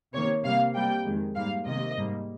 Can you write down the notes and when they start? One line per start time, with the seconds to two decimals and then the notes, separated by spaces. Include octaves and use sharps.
0.13 C3 D#3 A#3 C#5
0.44 C3 G3 A#3 F5
0.74 C3 G3 A#3 G5
1.05 F2 D#3 G#3
1.36 G#2 G3 A#3 F5
1.66 C3 D#3 A#3 D#5
1.97 G#2 G3 A#3